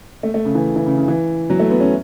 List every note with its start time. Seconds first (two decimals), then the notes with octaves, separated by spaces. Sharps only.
0.23 A3
0.34 A3
0.45 C#3
0.55 E3
0.76 E3
0.86 C#3
0.97 C#3
1.08 E3
1.50 F#3
1.59 A3
1.70 B3
1.80 C#4